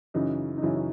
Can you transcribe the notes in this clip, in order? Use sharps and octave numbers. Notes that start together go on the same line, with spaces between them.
F#2 C#3 E3 D#4
D#4
F#2 C#3 E3 C#4 E4